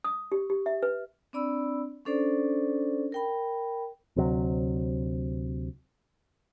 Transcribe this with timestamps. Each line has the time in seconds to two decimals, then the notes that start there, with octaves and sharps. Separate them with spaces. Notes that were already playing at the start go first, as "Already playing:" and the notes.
0.04 D#6
0.32 G4
0.50 G4
0.66 E5
0.83 B4
1.33 C4 D4 D5 B5 E6
2.05 C#4 D4 A4 C5 D5
3.12 A#4 G5 B5
4.16 D2 C3 F#3